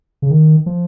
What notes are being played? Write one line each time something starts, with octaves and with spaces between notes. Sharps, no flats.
C#3
D#3
F3